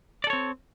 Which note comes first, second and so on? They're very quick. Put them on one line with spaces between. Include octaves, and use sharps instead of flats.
D5 A4 C#5 C4